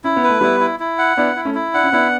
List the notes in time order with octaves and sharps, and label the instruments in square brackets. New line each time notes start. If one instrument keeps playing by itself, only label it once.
[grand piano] C#4 [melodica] E4
[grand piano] B3
[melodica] B4
[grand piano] A3
[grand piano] G3 B3 [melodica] E4
[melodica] E4
E4
F#5
[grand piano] B3 D4 [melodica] E4
[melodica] E4
[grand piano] A3 C#4
[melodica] E4
[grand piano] D4 [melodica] F#5
[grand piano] C#4
[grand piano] B3 D4 [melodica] E4